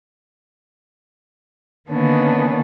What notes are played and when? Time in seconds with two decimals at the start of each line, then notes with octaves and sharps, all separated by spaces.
1.90 D3 D#3 A#3 B3 C#4 D4